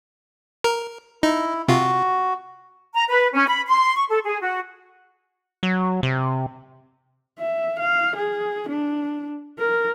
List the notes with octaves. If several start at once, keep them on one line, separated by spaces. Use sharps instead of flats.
A#4
D#4 E4
C3 F4 F#4
A#5
B4
C#4
B5
C6
C#6
A4
G#4
F#4
F#3
C3
E5
F5
G#4
D4
A#4